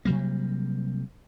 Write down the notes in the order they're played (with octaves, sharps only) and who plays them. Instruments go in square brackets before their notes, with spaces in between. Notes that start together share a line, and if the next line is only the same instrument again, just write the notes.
[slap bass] C3 F#3 G3 A#3